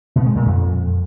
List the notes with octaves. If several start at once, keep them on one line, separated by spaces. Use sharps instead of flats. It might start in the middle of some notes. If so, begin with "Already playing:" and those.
B2
G#3
A#2
F2